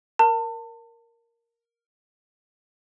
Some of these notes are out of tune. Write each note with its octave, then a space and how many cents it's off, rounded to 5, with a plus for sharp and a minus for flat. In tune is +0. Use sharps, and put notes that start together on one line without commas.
A#4 +0 A5 +35